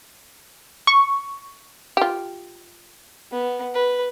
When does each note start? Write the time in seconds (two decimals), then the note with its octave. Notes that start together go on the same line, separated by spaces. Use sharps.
0.87 C#6
1.97 F4 G4
3.32 B3
3.75 B4